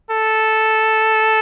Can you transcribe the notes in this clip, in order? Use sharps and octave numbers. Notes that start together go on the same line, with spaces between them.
A4